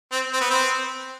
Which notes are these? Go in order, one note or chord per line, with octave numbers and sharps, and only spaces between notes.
C4
C4
B3
C4